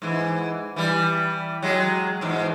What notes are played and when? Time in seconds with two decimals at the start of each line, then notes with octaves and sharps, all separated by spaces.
0.02 G#2 E3
0.76 E3 G3
1.62 F#3 G#3
2.21 E2 G#2